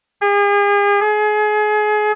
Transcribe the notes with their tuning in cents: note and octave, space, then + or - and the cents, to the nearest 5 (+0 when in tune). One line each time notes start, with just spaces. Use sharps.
G#4 -40
G#4 +30